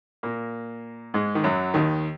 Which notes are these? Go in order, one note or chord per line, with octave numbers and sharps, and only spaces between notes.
A#2 A#3
G#2 G#3
D#3
F#2 F#3
D#2 D#3